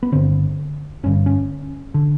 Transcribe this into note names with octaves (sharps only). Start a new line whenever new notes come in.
B3
G1 G2 D3 C4
G1 G2 D3 C#4
C#4
D3